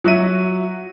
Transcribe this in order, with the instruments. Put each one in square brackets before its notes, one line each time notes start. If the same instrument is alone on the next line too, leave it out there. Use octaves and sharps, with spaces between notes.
[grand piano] F#3 F#4 E5 D#7